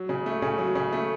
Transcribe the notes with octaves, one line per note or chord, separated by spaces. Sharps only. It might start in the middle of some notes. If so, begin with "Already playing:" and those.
Already playing: F#3
C#3
A3
C#3
F#3
C#3
A3